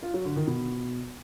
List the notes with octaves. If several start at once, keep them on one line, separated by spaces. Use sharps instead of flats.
F4
F#3
D3
D#3
B2